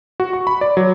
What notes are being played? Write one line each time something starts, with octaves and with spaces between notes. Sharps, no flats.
F#4
C#6
B5
D5
F#3